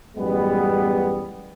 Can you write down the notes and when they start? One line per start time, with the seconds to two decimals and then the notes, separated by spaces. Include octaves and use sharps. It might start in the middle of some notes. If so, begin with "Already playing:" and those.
0.17 A1 F#2 G3 G#3 B3